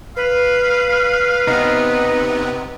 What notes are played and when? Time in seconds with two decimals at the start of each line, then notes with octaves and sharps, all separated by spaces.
0.16 B4 F5
1.47 C3 B3 C4 D#4